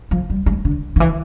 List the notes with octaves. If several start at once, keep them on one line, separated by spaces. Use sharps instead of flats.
F3
G3
G#3
D3
D#3
E3